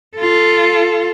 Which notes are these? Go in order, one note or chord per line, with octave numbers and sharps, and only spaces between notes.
F4 A4